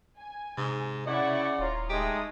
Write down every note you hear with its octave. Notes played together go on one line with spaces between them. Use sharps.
G#5
G#2 C3
C#3 E4 D5 F#5 C#6
D#1 F4 C#5 A#5
G#3 A3 D#4 G4 D#6